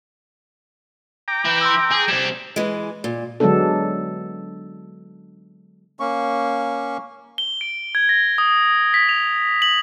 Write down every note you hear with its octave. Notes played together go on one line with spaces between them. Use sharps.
G5 A#5 D6
E3 E4
C6 E6
G#4
G3 C4 G#6 E7
E3 G#3
A#2
D3 F#3 G#3 B3 D4 A4
A#3 C#4 C#6
G7
D7
G#6
A#6
D#6
B6
F7
F#7